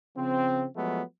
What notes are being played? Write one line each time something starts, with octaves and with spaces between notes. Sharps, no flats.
C#3 F3 C4
F3 F#3 G#3 A3 B3